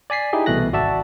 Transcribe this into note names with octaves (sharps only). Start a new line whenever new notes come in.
D5 G#5 B6 C7
D#4 E4 G4 G#4
C2 B2 E3 A3 F#6 A#6
G#1 F#4 D5 E5 A5